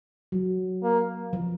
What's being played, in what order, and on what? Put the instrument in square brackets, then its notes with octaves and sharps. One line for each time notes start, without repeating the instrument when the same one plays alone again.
[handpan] F#3
[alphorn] A#3
[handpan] F3